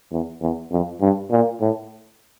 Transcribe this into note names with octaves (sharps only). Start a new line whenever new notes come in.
E2
E2
F2
G2
A#2
A2